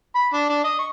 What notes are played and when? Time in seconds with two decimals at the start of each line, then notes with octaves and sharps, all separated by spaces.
0.15 B5
0.33 D4
0.50 D4
0.64 D#5
0.79 C#6